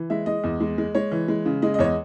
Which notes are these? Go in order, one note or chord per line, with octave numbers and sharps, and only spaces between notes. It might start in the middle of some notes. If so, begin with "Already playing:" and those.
Already playing: E3
G#3 E5
G#3 D#5
E2
G#3
G#3
G#3 C#5
E3
G#3
C#3
G#3 D#5
D#5
E2 C#5
D#5